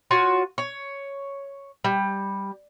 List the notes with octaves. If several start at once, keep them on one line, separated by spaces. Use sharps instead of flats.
F4 F#4 C#5
C#5
G3